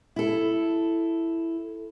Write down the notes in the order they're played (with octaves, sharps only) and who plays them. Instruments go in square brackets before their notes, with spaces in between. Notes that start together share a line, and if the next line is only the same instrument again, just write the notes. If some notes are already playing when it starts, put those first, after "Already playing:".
[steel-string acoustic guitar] E4 A4